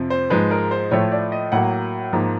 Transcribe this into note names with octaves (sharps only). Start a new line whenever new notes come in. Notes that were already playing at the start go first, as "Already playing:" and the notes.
Already playing: F2 C3 F3
C5
G#2 F3 G#3 B4
A#4
C5
A2 F3 A3 C#5
D5
D#5
A2 F#3 A#3 F#5
G#2 F3 A#3